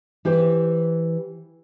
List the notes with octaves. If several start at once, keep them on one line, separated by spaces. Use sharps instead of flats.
E3 G4 B4 C5